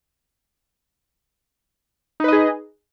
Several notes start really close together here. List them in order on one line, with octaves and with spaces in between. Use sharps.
D#4 B4 D#5 G#4